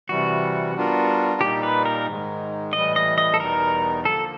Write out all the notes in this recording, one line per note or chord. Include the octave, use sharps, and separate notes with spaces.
C3 E3 G3 F#4
G3 B3 D4 F4 A#4
A#2 G3 A#3 D#4 G4
B4
A#4
G#2 D#3 G#3
A2 E3 G3 D#5
D#5
D#5
A4
E2 B2 G3 B3 D#4 A#4
D3 F3 A#3 A4